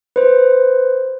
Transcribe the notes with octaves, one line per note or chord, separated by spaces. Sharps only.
B4 C5